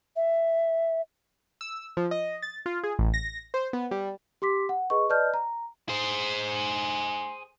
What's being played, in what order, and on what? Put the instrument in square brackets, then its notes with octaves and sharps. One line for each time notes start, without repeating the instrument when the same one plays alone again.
[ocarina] E5
[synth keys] E6
F3
D#5
A6
F4
G#4
A1
A#6
C5
B3
G3
[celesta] G4 C6 D6 B6
F#5
G#4 B4 D#5 C#6
B4 D5 D#5 A5 F6 G6
A#5
[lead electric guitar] G#4 C5